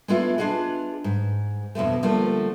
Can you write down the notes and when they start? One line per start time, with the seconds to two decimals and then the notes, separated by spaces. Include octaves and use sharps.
0.08 G#3 A3 B3 D4 E4 F4
0.38 D4 F4 G#4 D#5 F#5
1.04 G#2
1.75 F2 B2 D3 A3
2.03 D3 F3 G3 A3 A#3 D4